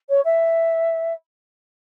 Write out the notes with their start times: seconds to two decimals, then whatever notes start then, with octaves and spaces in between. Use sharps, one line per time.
0.10 C#5
0.25 E5